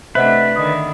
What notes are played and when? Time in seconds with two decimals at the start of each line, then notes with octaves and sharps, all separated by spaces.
0.15 C3 A3 D4 B4 C5 D#5 E5 F#5
0.56 D3 D#3 D#5 B5 D#6